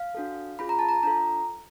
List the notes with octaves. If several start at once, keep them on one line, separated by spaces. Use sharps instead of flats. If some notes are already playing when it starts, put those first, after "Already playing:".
Already playing: F5
D4 F#4 A4
C#4 F4 G#4 B5
A#5
A5
A#5
D4 F4 A4 A#5